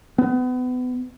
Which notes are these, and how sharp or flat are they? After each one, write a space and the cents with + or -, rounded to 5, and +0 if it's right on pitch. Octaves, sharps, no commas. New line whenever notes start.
B3 +30